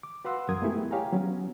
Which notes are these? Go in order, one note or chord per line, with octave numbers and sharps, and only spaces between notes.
D6
F#4 B4 F5 F#5 C6 E6
C2 F#2 A#4 D#6 G#6
G#3 A3 B3 E4 G4 G#4
G4 C#5 F5 G5 G#5 A#5
F#3 B3 C#4